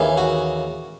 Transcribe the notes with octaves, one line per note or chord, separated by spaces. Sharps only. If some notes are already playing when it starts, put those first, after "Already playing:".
Already playing: D#2 C#3 E3
F#4